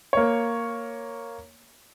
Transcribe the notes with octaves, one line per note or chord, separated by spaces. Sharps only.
A#3 C#5